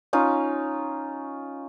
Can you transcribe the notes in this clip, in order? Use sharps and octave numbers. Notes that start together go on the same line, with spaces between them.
C#4 D#4 F4